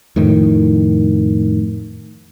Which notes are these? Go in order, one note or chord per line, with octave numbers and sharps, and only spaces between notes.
F2 A2 D#3